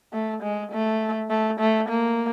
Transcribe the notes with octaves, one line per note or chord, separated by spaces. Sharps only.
A3
G#3
A3
A3
A3
A#3